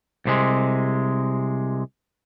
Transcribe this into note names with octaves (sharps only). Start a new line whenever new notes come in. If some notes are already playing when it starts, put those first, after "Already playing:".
C2 C3 G#3